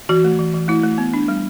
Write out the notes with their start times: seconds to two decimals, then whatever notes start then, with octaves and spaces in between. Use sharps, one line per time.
0.09 E3 F#4
0.24 A3
0.39 E3
0.54 E3
0.68 A3 E4
0.83 A3
0.98 B3
1.14 D4
1.28 G3